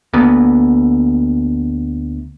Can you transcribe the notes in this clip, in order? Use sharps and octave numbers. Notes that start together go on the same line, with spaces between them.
D2 A#3 B3